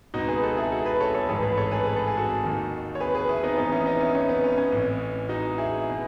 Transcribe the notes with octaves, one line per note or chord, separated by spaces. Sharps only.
C#2 B2 D#4 F#4
G#4 B4
F#4 A4
E4 G#4
F#4 A4
G#4 B4
A4 C#5
A4 C#5
A1 G#2 D#3 G#4 B4
G#4 B4
A4 C#5
G#4 B4
B4
A4
G#4
F#4 A4
D#2 D#3
C#5
G#4 B4
G#4 B4
E4 G#4
B3 D#4
A1 A2 E3 B3 D#4
C#4 E4
B3 D#4
C#4 E4
C#4
B3
C#4
C#4
A1 A2 E3
D#4 F#4
E4 G#4
B2